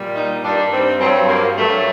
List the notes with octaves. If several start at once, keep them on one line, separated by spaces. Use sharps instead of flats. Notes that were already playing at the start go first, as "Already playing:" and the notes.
Already playing: A#2 G3
D#4
G2 D#3 G3 D4
C4
G2 F#3 C4
A#3
G2 F#3 A3